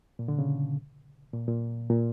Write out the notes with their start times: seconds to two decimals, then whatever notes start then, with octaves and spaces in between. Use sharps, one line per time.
0.19 A#2
0.28 D3
0.39 C#3
1.33 A#2
1.47 A#2
1.90 A#2